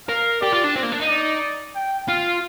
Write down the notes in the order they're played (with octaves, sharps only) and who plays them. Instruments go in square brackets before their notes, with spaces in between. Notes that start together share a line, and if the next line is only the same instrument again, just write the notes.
[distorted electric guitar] A#4 [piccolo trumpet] F5
[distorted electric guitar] G4 [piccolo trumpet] D5
[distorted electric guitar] F4
D4
C4
A#3
D4
D#4
[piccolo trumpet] D5
G5
[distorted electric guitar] F4 [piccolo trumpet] F5